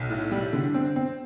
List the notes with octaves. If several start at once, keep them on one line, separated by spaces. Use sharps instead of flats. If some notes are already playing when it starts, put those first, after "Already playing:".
Already playing: B1
A2
G3
D3
C4
C4